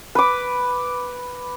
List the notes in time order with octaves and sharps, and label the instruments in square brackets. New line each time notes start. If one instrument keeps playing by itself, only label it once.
[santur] B4 D6